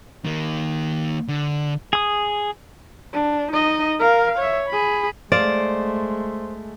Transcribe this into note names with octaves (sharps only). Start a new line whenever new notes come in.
D#3 A#3
D3
G#4 D#6
D4
D#4 D#5
A#4 F5
C#5 E5
G#4 B5
G#3 A3 C5 D5 F5